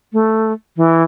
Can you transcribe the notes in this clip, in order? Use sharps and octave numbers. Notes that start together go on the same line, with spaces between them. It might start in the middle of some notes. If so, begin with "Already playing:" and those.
A3
E3